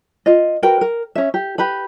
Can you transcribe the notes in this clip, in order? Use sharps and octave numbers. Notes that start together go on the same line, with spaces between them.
F4 D#5
F#4 A#4 B4 G5
A#4
C#4 E5
G4
G4 B4 B5